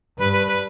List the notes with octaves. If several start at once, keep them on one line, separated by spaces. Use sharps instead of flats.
G2 B4
B4
B4